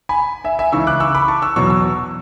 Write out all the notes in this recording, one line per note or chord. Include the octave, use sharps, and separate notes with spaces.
G#5 B5
E5 G#5
E5 G#5
C#2 C#3 E3 C#6 E6
D6 F#6
C#6 E6
B5 D6
A5 C#6
C#6 E6
E2 B2 F#3 C#6 E6
C#6 E6